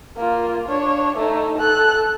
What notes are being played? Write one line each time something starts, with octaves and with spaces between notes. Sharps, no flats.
A#3 F4
D4 C#5
A3 D#4
A4 F#6